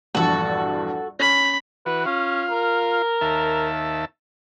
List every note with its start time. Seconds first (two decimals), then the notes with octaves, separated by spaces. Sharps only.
0.15 A#1 E2 G2 F#4 A4
1.19 C#4 B5
1.86 E3 F#4 B4
2.06 C#4 F4 F5
2.51 A#4
3.21 D#2 E5 A5